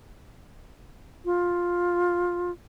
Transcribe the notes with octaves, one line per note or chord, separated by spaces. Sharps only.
F4